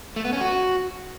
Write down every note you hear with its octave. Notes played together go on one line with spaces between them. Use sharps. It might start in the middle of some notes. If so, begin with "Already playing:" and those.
A3
B3
C#4
F#4